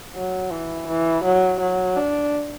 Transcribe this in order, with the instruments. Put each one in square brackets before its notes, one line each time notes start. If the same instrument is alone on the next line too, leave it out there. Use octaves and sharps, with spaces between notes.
[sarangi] F#3
E3
E3
F#3
F#3
D4